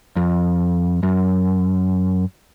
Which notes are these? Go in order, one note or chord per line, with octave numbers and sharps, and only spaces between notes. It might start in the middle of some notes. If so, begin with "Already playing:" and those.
F2
F#2